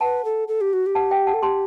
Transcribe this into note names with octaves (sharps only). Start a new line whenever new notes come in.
B4 F#5 A5
A4
A4
G4
F#4
G4
F#5 A5
E5 G5
F#5 A5
A4
G4 A5 C6